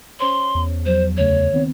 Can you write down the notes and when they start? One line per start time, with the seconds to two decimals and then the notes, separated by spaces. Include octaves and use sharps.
0.20 C#4 C5 C#5 C6
0.55 E2
0.86 F3 F#3 C5
1.17 D2 C#3 A3 C#5
1.53 D#3 B3 C4